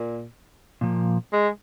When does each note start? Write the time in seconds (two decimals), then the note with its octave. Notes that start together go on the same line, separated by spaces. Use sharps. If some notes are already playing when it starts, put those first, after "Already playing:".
Already playing: A#2
0.81 A#2 F3 A#3
1.33 G#3